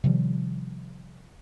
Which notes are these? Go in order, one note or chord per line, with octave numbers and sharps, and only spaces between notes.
C3 D#3 F3 G3